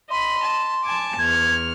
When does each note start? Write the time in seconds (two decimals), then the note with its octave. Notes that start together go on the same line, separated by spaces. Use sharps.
0.11 D#5 B5 C6
0.46 A5
0.84 G#5 A5 D6
1.19 E2 F6 G#6